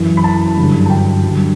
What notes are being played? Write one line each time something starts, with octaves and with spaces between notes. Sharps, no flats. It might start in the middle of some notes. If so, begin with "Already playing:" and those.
Already playing: F#2 E3
B5
A5
G2 D3 F#3
A5
G5
G2 D3 F#3